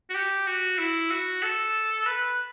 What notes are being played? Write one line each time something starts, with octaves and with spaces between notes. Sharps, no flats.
F#4
G4
F#4
E4
F#4
A4
B4